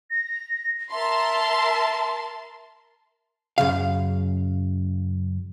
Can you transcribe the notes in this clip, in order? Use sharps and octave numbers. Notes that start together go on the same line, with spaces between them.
A#6
A#4 E5 A5 C6
F#2 C#3 F5